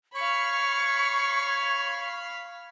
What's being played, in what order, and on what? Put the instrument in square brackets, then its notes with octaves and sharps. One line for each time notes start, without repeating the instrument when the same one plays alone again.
[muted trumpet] C#5 [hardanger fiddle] F5 B5 [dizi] C#6